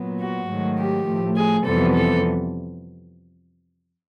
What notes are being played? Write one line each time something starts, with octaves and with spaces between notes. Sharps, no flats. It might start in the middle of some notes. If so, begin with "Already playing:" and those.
Already playing: A#2 F#3 B3
F#4
G#2 D#3 F#3 A3
G4
A2 F3 A3
G#4
F2 C3 E3 G3 B3 A4
A4